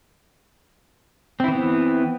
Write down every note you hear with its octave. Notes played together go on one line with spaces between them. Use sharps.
E3 B3 C4 E4